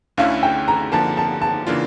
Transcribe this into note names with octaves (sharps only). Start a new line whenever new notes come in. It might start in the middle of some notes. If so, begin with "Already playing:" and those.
D2 D3 A3 C#4 E4 F5
G5
A#5
D3 F3 A#3 A5
A5
A5
C#3 E3 A#3 D4 F4